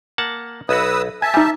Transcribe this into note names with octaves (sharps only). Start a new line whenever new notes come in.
A#3 F#5 A5
B1 F#4 B4 D#6 E6
E5 G#5 A5 G#6
G3 D#4 G#5